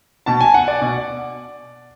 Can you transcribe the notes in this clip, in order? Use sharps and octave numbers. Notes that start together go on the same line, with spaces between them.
B2 A5
G#5
F#5
D5
B2